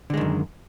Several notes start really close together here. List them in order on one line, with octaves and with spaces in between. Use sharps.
D3 G#3 D#3 F#2